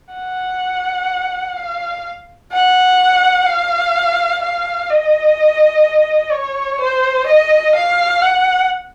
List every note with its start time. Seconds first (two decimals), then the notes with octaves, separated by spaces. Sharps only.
0.14 F#5
1.56 F5
2.52 F#5
3.46 F5
4.42 F5
4.90 D#5
6.32 C#5
6.80 C5
7.27 D#5
7.75 F5
8.22 F#5